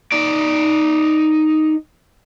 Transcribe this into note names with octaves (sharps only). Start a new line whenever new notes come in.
D#4 D5